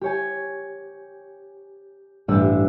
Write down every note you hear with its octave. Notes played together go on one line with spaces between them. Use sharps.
G4 C#5 G#5
A1 G2 D4 G4 E6